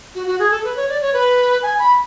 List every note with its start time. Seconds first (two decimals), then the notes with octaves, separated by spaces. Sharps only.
0.15 F#4
0.27 F#4
0.39 G#4
0.51 A4
0.64 B4
0.76 C#5
0.89 D5
1.01 C#5
1.13 B4
1.62 G#5
1.79 B5